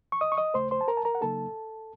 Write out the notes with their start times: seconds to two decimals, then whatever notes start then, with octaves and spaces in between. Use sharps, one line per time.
0.12 C#6
0.21 D#5 D#6
0.32 C#6
0.37 D#5 D#6
0.54 D#2 C#3 A3 C5 C6
0.71 C5 C6
0.81 A5
0.88 A#4 A#5
0.97 A5
1.05 A#4 A#5
1.15 F#5
1.21 C#3 F#3 A#3 D#4 A4 A5